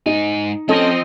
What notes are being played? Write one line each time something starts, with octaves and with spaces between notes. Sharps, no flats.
G#2 D#4 G#5
F3 C4 C#4 A4 D#5